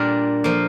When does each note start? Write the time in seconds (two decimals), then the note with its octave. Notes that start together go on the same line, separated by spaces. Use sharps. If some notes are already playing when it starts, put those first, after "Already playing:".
Already playing: A#2 G3 D4 A#4
0.44 F3 A#3